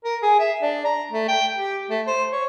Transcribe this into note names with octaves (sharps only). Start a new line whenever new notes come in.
A#4
G#4
E5
D4
A#5
A3
G5
G4
A3
C5
C#5